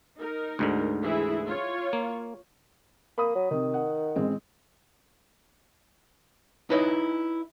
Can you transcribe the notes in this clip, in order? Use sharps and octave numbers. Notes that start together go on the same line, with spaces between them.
D#4 A#4
D2 G#2 D3
E3 E4 G#4
F4 C#5
A#3
A#3 B5 D#6
F#3
C3 D#3
F#5
A1 G#3 C4
D#4 E4 B4 C#5 D#5